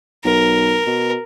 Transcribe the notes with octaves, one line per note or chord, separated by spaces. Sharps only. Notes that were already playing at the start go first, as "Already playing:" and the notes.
B1 A#4
B2